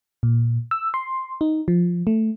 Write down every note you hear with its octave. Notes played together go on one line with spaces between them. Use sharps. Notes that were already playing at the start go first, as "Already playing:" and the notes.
A#2
E6
C6
D#4
F3
A3